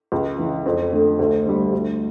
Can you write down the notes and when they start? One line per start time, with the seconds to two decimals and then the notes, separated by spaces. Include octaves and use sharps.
0.12 C#2
0.38 C#3 E3
0.66 F2
0.92 D3 A3
1.19 D2
1.46 D3 G3
1.73 D2